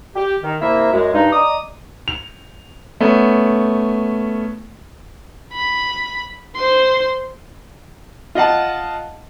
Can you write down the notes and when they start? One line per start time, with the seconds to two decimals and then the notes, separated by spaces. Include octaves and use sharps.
0.16 G4
0.43 D#3
0.61 C3 A#3 E4 E5
0.93 F#2 G#3
1.14 G2 D#4
1.33 D5 D#5 A#5 D6 D#6
2.08 F7
3.00 A3 B3 C#4
5.54 B5
6.56 C5 C6
8.35 F4 D#5 F#5 A5